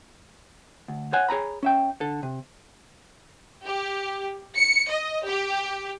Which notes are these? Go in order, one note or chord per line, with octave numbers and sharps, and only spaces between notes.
D2
C5 C#5 F#5 G#5
G#4 C#5 A#5 B5
C#4 E5 G5
D3 A4
C3
G4
C#7
D#5
G4